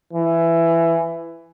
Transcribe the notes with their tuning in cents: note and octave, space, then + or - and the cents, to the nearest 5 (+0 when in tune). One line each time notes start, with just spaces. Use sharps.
E3 +15